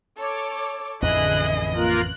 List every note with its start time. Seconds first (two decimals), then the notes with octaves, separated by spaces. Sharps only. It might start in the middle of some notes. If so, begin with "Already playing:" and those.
0.17 A4 C#5 D6
1.02 A1 F2 D3 E3 E4 G#4 D#5 F#6
1.75 A#3 F4 A#4 F#6